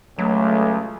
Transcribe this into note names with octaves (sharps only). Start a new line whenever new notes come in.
C#2 F#3 A3